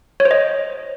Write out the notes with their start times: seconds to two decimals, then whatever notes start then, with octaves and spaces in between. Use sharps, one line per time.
0.20 C#5
0.25 C5
0.31 D#5